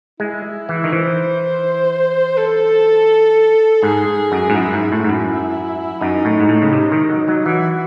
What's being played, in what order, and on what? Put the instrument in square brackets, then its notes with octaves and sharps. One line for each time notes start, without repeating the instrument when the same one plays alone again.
[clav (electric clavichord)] G#3 [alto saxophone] E4
[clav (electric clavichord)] E3
D#3
[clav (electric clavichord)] E3 [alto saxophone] C5
[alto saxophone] A4
[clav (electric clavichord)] G#2 [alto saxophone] G#4
[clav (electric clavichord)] F#2
G#2
[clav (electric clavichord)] F#2 [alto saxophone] E4
[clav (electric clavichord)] G#2
A2
G#2
F#2
[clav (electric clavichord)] F#2 [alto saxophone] D#4
[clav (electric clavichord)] A2
G#2
A2
C#3
C3
D#3
F#3
F#3
[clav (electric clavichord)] E3 [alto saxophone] F#4